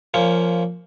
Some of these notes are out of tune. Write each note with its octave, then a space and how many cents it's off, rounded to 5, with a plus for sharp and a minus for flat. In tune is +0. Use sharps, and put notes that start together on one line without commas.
F3 -5 A#3 -10 C#4 +15